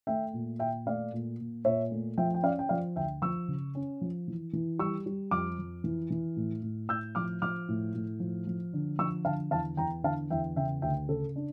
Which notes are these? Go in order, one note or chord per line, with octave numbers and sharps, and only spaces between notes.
A3 E5 G5
A#2
A#2 E5 G5
A3 D5 F5
A#2
A#2
A#2 C#5 E5
A3
F3 E5 G5
G5
C#4 D5 F5
G5
F3 D5 F5
D2 E5 G5
F3 C#6 E6
C#3
C#4
F3
E3
E3
G3 C#6 E6
G3
F2 D6 F6
F2
E3
E3
A2
A2
A2 E6 G6
F3 D6 F6
F3 D6 F6
A2
A2
F3
F3
D3
F3 C#6 E6
D3 F5 A5
E2 F5 A5
E2 G5 A#5
D3 F5 A5
E2 E5 G5
C#3 E5 G5
D2 E5 G5
C#3 A4
D4